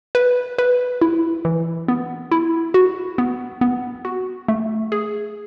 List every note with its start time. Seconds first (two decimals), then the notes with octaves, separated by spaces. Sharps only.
0.15 B4
0.58 B4
1.01 E4
1.45 E3
1.88 B3
2.31 E4
2.74 F#4
3.18 B3
3.61 B3
4.05 F#4
4.48 A3
4.92 G#4